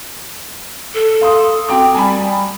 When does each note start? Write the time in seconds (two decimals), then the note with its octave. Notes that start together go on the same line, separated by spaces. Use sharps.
0.94 A4
1.21 F5 C6 D#6
1.69 C4 F#4 G5 D6
1.94 G3 G#5 B5